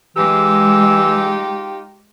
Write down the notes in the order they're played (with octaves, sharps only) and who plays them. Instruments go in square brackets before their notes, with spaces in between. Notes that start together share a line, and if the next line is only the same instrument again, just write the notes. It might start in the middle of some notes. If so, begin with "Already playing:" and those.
[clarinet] E3 [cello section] G#3 [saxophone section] D#4 F4 G4 [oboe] E6